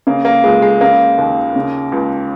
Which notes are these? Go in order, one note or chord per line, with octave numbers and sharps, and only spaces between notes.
C#3 A#3
A#3
C#2 G#3
G#3
C#3 A#3
D#2
C#3
C#2